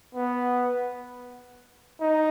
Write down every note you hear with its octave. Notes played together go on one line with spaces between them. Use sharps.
B3
D#4